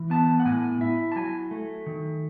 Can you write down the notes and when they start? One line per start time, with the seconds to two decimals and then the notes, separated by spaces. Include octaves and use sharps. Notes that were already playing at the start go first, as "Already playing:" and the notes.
Already playing: E3
0.10 B3 A5
0.40 F#5
0.45 A2 G#5
0.81 E4 E5
1.12 A5
1.16 F#3 G#5
1.51 A3
1.86 D#3